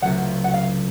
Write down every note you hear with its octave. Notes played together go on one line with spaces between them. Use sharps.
C#2 C3 F#3 A3 F#5
F#5
F5